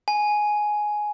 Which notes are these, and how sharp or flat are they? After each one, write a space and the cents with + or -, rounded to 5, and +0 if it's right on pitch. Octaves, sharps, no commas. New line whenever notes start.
G#5 +10